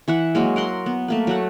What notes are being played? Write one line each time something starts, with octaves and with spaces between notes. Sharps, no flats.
E3 E5 F#5
F#3 G#3 A#3
A#4 F#5 C6
B3
A3 A#3 B4
F#3 A3 F#5